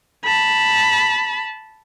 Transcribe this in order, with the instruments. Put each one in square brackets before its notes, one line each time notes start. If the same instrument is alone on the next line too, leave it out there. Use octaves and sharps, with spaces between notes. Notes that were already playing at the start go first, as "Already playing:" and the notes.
[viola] A5 B5